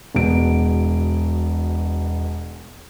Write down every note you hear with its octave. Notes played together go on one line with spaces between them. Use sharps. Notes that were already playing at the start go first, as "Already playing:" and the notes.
E1 B2 D7